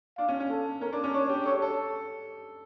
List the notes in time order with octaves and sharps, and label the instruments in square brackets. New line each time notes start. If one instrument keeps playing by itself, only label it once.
[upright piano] D4 [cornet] F5
[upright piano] C#4
C#4
[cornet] A4
[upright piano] C#4 [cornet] A#4
[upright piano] D4
C#4
[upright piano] D4 [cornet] C#5
[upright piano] G4
[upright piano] A4 [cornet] C#5
[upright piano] A4